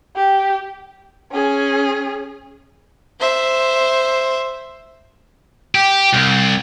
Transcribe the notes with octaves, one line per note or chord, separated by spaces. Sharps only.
G4
C#4 G#4
C5 E5
G4
C2